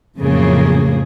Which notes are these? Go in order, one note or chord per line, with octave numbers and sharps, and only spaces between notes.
F2 A2 C#3 F#3 A#3 G#4